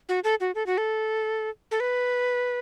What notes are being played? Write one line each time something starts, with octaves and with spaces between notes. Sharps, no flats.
F#4
A4
F#4
A4
F#4
A4
A4
B4